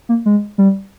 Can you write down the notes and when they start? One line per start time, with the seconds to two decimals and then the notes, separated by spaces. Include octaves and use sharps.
0.09 A#3
0.26 G#3
0.58 G3